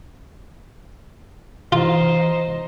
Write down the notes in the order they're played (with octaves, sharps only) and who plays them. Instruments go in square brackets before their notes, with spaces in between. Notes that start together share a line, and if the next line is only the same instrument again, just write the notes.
[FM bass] E3 [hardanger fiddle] D#4 C5 [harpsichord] F4